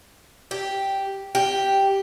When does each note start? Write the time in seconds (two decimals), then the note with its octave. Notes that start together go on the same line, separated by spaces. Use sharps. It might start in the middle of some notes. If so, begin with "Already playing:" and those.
0.51 G4
1.35 G4